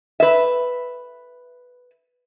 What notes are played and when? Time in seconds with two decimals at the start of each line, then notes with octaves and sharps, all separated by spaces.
0.20 B4 E5